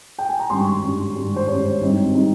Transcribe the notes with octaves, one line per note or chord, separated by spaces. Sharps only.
G5
G#5
A#5
G#1 G2 G3 C#4 C6
C#6
C6
G#1 G2 G3 C#4
G#1 G2 G3 C#4
C5
G#1 G2 G3 C#4 C#5
G#1 G2 G3 C4 D#4
G3 C4 D#4